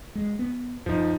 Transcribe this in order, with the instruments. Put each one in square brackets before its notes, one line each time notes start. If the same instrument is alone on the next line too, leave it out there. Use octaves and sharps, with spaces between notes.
[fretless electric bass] G#3
B3
[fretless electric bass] F#2 [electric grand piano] F3 D#4